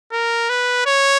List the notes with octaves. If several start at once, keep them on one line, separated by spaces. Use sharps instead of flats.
A#4
B4
C#5